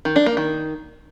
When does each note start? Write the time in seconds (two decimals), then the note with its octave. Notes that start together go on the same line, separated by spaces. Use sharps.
0.05 D#3
0.16 D4
0.26 A#3
0.37 D#3